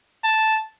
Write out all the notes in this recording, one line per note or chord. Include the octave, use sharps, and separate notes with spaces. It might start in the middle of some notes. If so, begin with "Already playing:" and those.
A5